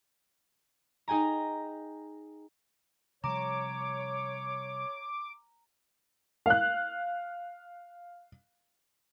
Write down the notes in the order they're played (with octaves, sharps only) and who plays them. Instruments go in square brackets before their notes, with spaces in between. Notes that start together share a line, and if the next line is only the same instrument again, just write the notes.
[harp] D#4 G#4 G5 G#5 A#5
[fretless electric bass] C3 F3 G3 [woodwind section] C#5 [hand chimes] A#5 [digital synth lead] D6
[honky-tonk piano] F5 F#6